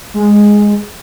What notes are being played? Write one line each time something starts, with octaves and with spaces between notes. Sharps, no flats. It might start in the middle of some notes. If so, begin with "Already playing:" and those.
G#3